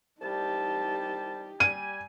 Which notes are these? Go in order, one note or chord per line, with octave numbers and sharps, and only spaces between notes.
C2 G3 D#4 G4 A5
G3 G#5 D#7